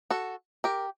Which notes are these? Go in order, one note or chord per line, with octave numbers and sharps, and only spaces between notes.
F#4 A4
G4 A#4